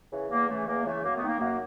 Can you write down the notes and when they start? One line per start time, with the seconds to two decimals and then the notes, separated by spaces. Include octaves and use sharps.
0.11 C#3 E3
0.30 E2 A#3
0.48 C#3 E3 A3
0.66 E2 A#3
0.85 C#3 E3 A3
1.03 F#2 A#3
1.15 A3 B3
1.22 D#3
1.27 A#3
1.40 F#2 A#3